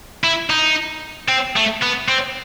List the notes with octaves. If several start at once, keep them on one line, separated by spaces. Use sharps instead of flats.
E4
D#4
C4
A3
B3
C4